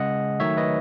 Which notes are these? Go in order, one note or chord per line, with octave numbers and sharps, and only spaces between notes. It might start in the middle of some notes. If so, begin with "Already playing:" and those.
Already playing: C#3 G#3 D#5 F#5
D#3 F#3 A3 C#5 E5
B4 D#5